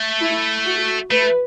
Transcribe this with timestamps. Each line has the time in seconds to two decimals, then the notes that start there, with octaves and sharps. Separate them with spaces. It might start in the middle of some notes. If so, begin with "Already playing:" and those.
Already playing: A3
0.21 E4
0.66 F#4
1.10 A3 B4